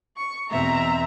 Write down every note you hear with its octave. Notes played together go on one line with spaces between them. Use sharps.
C#6
E2 B2 C4 E5 A#5